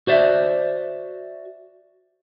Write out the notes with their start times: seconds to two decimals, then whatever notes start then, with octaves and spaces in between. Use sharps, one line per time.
0.07 F#4 C5 D5 E5